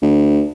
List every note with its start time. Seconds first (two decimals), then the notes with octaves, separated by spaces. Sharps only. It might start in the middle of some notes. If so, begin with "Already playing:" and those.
0.02 D2